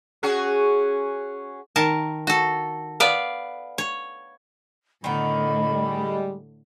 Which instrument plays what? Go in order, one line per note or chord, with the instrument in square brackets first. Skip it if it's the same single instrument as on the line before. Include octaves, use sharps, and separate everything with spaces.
[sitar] C#4 F#4 G#4
[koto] D#3 A#4 A5
F#4 A4
B3 B4 D5 F5
C#5
[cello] A2 D3 [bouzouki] D#3 B3 D#4 [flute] B5
[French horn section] G3 G#3